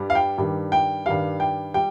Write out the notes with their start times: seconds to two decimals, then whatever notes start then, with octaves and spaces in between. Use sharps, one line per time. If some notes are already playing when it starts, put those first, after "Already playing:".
Already playing: G2 G3
0.10 F5
0.15 G5
0.38 G2 D#3 G3
0.72 G5
1.06 G2 D#3 G3 F5
1.40 G5
1.74 G3 G5